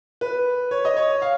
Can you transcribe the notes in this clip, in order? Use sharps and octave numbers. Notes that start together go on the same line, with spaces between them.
B4
C#5
D#5
C#5
F5